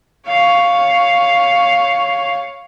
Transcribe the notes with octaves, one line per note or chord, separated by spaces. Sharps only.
C#5 F5